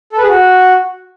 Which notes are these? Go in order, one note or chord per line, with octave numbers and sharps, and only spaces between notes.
A4
B4
G#4
F#4